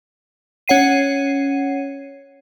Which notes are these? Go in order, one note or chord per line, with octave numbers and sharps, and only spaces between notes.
C#4 C#5 F#5 C7 D#7